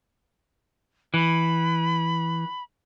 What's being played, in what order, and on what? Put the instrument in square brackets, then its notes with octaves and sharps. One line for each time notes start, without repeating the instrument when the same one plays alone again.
[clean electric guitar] E3 [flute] B5